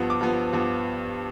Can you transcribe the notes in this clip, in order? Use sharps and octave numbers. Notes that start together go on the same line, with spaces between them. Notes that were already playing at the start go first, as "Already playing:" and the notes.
Already playing: G2 F3 B3
D6
G2 F3 B3
G2 F3 B3